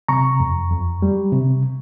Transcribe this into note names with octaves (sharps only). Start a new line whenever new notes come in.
C3 A#5 C#6
F2
F2
G3
C3